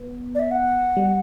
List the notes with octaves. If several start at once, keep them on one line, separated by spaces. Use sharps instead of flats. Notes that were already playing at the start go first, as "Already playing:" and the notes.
Already playing: B3
D5
E5
F#5
G3